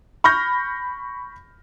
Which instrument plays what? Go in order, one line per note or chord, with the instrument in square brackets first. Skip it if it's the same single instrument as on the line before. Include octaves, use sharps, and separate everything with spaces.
[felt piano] B5 C#6 F6 G6 A#6